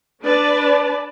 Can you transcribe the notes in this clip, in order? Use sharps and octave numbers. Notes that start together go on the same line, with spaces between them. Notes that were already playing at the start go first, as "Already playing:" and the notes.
D4 B4 D5 A5